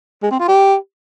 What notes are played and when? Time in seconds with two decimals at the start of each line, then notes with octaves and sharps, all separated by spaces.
0.23 G#3
0.31 C4
0.40 F4
0.48 G4